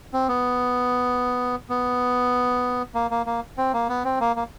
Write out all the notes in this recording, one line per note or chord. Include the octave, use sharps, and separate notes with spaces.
C4
B3
B3
A#3
A#3
A#3
C4
A#3
B3
C4
A#3
A#3